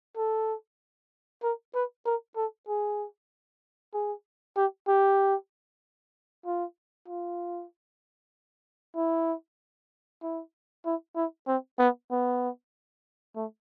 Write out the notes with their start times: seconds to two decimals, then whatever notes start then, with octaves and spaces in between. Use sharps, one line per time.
0.17 A4
1.43 A#4
1.75 B4
2.06 A#4
2.36 A4
2.68 G#4
3.94 G#4
4.56 G4
4.88 G4
6.46 F4
7.08 F4
8.96 E4
10.23 E4
10.86 E4
11.16 E4
11.47 C4
11.79 B3
12.11 B3
13.36 A3